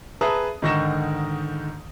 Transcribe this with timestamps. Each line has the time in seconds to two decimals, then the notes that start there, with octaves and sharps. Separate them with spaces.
0.21 G#4 B4 E5 A5 A#5 D#6
0.62 G#2 D3 D#3 C#6 A#6 E7